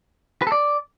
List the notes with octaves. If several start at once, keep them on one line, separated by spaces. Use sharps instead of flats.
B4
A4
D5